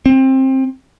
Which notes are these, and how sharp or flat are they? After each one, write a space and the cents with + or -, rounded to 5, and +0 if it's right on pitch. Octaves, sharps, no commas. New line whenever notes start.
C4 +20